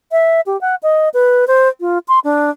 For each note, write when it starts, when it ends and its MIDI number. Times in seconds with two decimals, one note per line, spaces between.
0.12 0.41 76
0.46 0.59 67
0.61 0.75 78
0.83 1.09 75
1.14 1.47 71
1.47 1.68 72
1.80 1.98 65
2.08 2.19 84
2.24 2.50 62